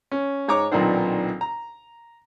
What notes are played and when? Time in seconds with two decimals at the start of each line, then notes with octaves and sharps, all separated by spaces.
0.12 C#4
0.48 G#2 C#5 A#5 D6
0.72 B1 A#2 D#3 C4 D4 C5
1.41 A#5